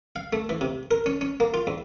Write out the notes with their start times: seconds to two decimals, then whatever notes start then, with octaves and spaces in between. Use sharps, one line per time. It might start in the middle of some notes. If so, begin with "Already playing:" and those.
0.16 F5
0.33 A3
0.49 E3
0.61 C3
0.91 A#4
1.06 C#4
1.21 C#4
1.40 A#3
1.54 F4
1.67 E2